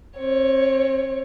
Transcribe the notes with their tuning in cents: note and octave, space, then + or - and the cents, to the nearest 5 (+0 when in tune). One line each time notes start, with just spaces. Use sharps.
C4 +35 C#5 +5